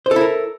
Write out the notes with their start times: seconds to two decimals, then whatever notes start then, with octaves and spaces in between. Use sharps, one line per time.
0.06 C5
0.11 A4
0.16 E4
0.21 A#4